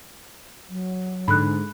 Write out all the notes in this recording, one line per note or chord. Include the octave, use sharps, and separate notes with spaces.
F#3
G#2 D3 B5 F#6